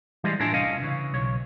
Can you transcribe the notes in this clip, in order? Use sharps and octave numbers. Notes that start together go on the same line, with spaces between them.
E3 G3 G#3 G#4 C5 D#5
A2 D4 F4 A#4 E5 G#5
C2 C#4 D#5 F5
C#3 E3
B1 C#3 C#5